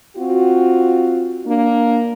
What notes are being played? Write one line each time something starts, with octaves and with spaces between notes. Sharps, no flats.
C4 F4 F#4
A#3 D4